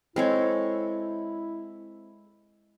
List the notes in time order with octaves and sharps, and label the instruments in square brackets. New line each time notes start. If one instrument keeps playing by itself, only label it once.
[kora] G#3 [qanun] C4 A4 C#5 [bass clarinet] E4